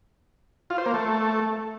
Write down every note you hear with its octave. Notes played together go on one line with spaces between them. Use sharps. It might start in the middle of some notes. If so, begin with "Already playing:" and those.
F4
C5
A#3
A3